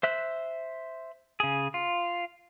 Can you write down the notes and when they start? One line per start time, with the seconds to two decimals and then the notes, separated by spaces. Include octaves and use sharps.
0.03 C5 E5 F#6
1.40 C#3 G#4
1.74 F4